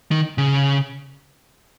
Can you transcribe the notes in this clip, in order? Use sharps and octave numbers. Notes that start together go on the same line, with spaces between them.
D#3
C#3